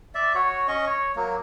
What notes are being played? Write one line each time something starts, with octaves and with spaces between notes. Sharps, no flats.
D5 E5
F#4 C#5
C#4 D#5 C#6
C#5
F#3 A#3